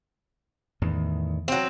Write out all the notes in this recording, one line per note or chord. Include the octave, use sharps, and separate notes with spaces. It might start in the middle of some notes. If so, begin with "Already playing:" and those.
E2 A2 D#3
F#3 C4